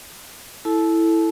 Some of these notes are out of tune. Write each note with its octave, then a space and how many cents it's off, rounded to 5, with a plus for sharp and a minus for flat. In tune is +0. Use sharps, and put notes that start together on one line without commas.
E4 +0 A4 +0 A5 -30